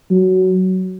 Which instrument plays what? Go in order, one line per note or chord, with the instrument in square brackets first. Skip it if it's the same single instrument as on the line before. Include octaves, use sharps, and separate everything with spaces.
[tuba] F#3